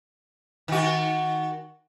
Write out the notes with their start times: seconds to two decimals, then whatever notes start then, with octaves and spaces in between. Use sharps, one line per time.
0.68 D#3 F#4